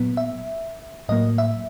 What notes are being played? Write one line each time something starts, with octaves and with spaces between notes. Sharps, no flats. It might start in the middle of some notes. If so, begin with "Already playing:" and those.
Already playing: A#2 F#3 B3
E5
A2 F#3 A#3 D#5
E5